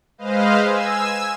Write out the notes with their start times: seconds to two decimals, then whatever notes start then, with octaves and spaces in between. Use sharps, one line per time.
0.18 G#3 B4 C5 D#5 F5
0.65 G#5 E6